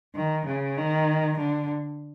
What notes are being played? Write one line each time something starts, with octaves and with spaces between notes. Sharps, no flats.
D#3
C#3
D#3
D3